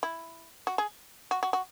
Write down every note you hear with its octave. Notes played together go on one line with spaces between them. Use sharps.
E4
F#4
G#4
F#4
F#4
F#4